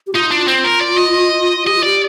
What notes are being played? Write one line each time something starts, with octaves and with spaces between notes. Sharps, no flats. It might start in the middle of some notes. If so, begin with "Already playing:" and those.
G4
D#4 F4
D4
F4
C4
A#4
D5
D#5
G4 D#5
F4
G4 D5